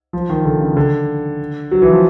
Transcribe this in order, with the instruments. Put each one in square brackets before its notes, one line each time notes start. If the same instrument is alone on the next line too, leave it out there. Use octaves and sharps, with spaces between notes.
[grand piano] F3
D#3
D3
C#3
D3
F#3
E3
F3